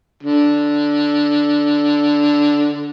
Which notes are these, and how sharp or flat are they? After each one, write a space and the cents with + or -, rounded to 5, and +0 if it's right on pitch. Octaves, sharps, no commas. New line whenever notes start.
D3 -5